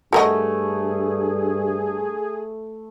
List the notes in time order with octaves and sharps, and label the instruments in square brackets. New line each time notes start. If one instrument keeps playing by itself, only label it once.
[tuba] G2 [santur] A3 [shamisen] F#4 A#4 D#5 [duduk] G#4